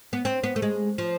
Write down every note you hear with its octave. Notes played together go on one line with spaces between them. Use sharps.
B3
C4
B3
A3
G#3
F3